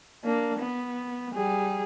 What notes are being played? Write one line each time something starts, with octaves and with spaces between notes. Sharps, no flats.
A#3 D4
B3
G3 G#4